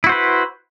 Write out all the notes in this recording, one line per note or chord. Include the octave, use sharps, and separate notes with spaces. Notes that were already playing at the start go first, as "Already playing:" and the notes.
E4 F#4 B4 C5